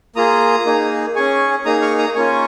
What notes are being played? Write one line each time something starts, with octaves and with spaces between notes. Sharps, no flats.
A#3 F4 G#4 A#5 D#6
A#3 D#4 G#4
C#4 G#4 G#5 C#6
A#3 D#4 G#4 A#5 D#6
C#6 F6
A#5 D#6
A#3 C#4 F4 G#5 C#6